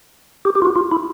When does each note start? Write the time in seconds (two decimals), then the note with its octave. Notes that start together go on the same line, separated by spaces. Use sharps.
0.45 G4
0.55 G4
0.62 F4
0.65 F#4
0.76 F4
0.92 E4